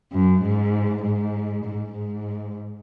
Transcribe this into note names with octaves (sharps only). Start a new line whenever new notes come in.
F#2
G#2
G#2
G#2
G#2